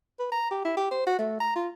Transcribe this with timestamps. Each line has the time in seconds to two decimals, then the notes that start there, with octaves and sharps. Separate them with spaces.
0.19 B4
0.32 A#5
0.51 G4
0.65 E4
0.77 G4
0.91 C5
1.06 F#4
1.18 A3
1.40 A#5
1.55 F4